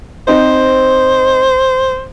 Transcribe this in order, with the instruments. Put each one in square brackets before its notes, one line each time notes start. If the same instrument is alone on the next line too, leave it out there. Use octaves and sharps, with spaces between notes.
[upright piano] C4 D#4 [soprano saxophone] C5